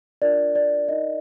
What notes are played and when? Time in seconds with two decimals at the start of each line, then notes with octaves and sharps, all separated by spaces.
0.22 D4 F4 A#4 D5
0.55 D5
0.89 D#4 A#4 D5 D#5